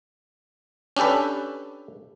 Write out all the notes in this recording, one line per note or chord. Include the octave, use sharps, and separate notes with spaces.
C#4 D4 G4 A4 B4